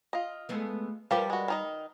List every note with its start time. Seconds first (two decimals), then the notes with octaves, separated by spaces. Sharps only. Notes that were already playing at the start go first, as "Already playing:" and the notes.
0.13 F4 D#5
0.49 G#3 A3 B3
1.11 F3 G3 G4 A#4 B4
1.30 G#3 F#4
1.48 D#3 D#4 D#5